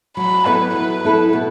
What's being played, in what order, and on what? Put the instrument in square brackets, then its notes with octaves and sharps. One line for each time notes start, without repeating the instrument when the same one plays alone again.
[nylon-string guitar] F#3 [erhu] B5
[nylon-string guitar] B3 E4 A4 [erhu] B4
[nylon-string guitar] F#3 [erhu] B4
[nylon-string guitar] B3 E4 A4 [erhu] B4
[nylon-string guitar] B2